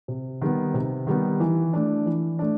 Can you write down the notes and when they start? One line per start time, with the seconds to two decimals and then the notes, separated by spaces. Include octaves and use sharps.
0.08 C3
0.42 D#3 G3 B3
0.74 C3
1.07 D#3 G3 B3
1.40 E3
1.73 A3 D4
2.06 E3
2.39 A3 D4